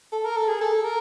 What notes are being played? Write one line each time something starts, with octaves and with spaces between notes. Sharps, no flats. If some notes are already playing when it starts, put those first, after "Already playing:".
A4
A#4
A4
G#4
A4
A#4